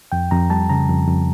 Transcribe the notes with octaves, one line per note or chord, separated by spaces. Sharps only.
F2 G5
F2 A#5
G3 A5
C#3 A#5
F2
F2